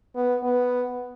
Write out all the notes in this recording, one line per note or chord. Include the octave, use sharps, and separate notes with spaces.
B3
B3